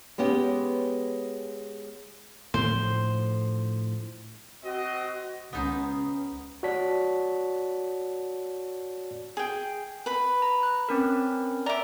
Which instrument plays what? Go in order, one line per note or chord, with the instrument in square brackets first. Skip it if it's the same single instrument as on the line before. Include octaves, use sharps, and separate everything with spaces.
[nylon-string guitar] G#3 B3 C#4 G4
[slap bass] A2 D3 F3 [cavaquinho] C5
[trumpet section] C4 D#5 [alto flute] F#4
[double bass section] C#2 C#4 [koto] B3 D#4 C5
[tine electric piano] F#4 C#5 D5 A5 B6
[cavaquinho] G#4 G5
B4 B5
[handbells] A#5
F#6
C4 C#4 A#4
[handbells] D5 E5 [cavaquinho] A#5 D6